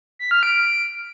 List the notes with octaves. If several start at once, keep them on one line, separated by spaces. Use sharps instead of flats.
B6
F6
D7